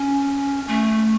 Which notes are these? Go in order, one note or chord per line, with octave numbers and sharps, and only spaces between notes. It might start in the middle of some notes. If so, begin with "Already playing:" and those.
Already playing: C#4
A3